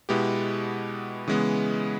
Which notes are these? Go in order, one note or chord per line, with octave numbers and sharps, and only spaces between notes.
B2 G#3 B3 E4 G4
C#3 E3 G#3 B3